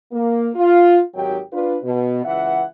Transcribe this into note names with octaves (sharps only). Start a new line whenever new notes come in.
A#3
F4
G#1 D#3 F#3 G4 G5
D4 F4 B4
B2
C#2 E3 E5 F#5